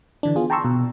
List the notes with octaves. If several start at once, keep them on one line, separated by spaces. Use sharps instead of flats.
D3 E3 D4
B3 F4 G#4
G5 A5 A#5 C6 C#6 E6
B2